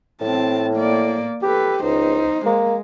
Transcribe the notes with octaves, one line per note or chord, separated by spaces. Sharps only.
A2 C4 A5
A#3 D5
G4 A4 B4
C#2 D#4 C5
G#3 A#3